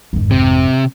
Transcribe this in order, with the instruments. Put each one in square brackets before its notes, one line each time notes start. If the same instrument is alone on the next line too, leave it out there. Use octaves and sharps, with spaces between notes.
[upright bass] G#1 F2
[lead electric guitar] C3